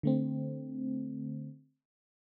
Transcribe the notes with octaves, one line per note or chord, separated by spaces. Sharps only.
D3 A3 C4